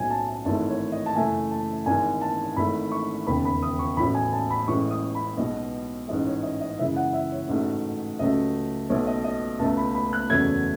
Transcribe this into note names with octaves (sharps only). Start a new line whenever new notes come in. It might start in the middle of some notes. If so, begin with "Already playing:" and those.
Already playing: B1 A2 F#3 G#5
A5
A5
G#1 G#2 E3 A3 A5
C#5
D#5
A5
F#2 C#3 E3 A3 G#5
A5
G#1 G#2 E3 G#5
A5
G#1 G#2 E3 A3 B5
C#6
E1 D#2 C#3 B5
B5
D#6
C#6
A1 A2 F#3 B5
G#5
A5
B5
A1 A2 E3 G#3 C#6
D#6
B5
B1 B2 G#3 D#5
A1 G#2 E3 G#3 D#5
C#5
D#5
D#5
F#2 C#3 E3 G#3 E5
F#5
E5
C#5
A1 G#2 F#3 A3
C#2 C#3 F#3 A3 D#5
B1 B2 F#3 A3 C#5
D#5
D#5
C#2 B2 A3 A5
B5
B5
F#6
F#1 E2 C#3 F#3 A3 G#6